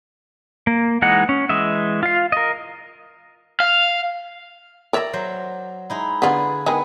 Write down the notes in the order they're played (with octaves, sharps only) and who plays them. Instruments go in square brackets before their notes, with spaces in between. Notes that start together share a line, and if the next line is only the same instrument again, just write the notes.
[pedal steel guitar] A#3
E3 G#3 D#4 F#5
C#4
E3 G#3 D#5 E5
F4 F5
A#4 D#5
[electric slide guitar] F5
[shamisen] A#4 C#5 E5 [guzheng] D5 A#5
[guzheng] F#3 C5
G#3 D#4 E4
[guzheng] D3 G#4 B5 [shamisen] B3 F4
[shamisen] D#3 G#3 G#4 [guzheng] B3